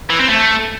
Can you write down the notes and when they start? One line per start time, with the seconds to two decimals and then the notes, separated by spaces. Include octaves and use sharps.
0.10 E3
0.20 C4
0.29 A3